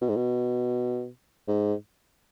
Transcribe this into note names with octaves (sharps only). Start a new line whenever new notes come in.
B2
G#2
B2
G#2